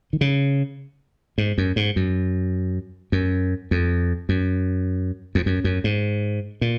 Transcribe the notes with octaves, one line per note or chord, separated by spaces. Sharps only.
D#3
C#3
G#2
F#2
G#2
F#2
F#2
F2
F#2
F2
F#2
F#2
G#2
A#2